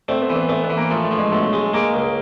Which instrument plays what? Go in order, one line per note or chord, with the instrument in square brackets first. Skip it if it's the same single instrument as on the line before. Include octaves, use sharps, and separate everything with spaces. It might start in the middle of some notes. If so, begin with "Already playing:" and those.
[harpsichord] A3 [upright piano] C4
[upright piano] B3
[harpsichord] E3
[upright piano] B3
[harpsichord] A3 [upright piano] B3
[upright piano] B3
[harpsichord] E3
[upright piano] A#3
[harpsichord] F3 [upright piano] A3
[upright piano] A3
[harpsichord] F3
[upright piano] G#3
[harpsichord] B1 [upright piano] A3
[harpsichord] G#3
[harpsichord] G#3 [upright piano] A#3
[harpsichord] C#2